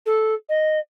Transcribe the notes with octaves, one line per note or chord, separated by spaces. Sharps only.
A4
D#5